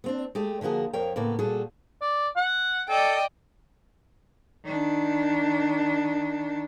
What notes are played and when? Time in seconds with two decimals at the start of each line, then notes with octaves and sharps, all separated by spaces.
0.04 B3 C4 D4
0.35 G#3 A3 G4
0.61 D3 F3 A#3 F#4 G#4
0.93 F2 F3 A#4 C#5 G5
1.16 A2 C#3 A#3 B3
1.39 A#2 G3 F#4 G#4 A4
2.02 D5
2.37 F#5
2.89 A4 D5 D#5 G5
4.65 D#3 D4